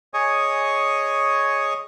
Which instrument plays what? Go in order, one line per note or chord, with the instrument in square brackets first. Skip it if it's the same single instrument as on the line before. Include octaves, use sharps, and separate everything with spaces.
[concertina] G#4 C#5 D#5 G#5 C#6 D#6